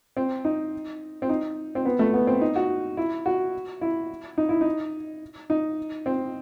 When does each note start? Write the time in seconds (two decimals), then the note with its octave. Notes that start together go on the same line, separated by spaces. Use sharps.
0.17 C4
0.44 D#4
1.22 C4
1.29 D#4
1.75 C4
1.85 B3
1.99 A3
2.14 B3
2.27 C4
2.41 D#4
2.56 F#4
2.97 E4
3.26 F#4
3.81 E4
4.38 D#4
4.49 E4
4.61 D#4
5.50 D#4
6.06 C4